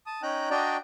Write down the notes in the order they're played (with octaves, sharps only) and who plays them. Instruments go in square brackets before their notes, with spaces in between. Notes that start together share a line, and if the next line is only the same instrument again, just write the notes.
[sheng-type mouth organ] A5 D#6
C#4 D#4 G5 A#5 F#6
D4 F#4 D5 D#5 G5 A#5